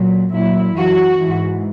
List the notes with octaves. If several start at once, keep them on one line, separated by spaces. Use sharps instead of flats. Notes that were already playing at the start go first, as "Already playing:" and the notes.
Already playing: A#2 F#3
A#2 F#3 E4
F#2 E3 F#4
G#2 E3